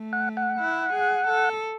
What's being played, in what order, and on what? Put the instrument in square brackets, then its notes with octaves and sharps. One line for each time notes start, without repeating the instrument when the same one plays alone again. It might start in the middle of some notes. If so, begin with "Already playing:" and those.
Already playing: [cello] A3
[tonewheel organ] F#5
F#5
[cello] E4
G#4
A4